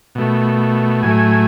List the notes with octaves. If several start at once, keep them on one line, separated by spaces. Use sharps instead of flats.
B2 A3
A2 F#3 A3 G#5